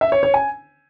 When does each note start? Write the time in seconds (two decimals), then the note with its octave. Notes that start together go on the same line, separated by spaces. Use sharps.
0.01 E5
0.12 C#5
0.23 C#5
0.34 G#5